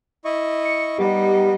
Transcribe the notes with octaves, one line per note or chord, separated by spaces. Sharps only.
E4 D#5 C#6
C#7
G3 B3 D#4 G4